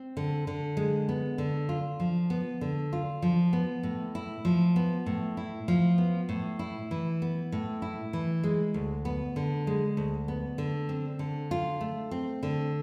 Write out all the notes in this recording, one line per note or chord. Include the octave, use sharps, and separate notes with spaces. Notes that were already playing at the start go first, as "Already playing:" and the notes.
Already playing: C4
D3
D3
G#3
B3
D3
F4
F3
B3
D3
F4
F3
B3
A2
E4
F3
B3
A2
E4
F3
B3
A2
E4
E3
B3
A2
E4
E3
G#3
D2
B3
D3
G#3
D2
B3
D3
C4
D3
F4
A3
C4
D3